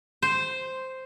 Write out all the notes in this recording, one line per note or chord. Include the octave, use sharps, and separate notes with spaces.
C5